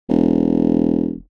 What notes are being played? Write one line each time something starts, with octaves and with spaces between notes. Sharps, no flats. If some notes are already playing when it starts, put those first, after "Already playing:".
E1